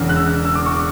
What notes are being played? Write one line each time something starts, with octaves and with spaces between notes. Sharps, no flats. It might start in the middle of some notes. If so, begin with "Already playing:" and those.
Already playing: E1 E2 C#3
F#6
E6
E6
D6
C#6
D6